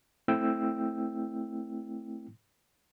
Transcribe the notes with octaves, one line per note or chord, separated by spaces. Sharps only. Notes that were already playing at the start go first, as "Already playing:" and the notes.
A3 C4 E4 G5 E6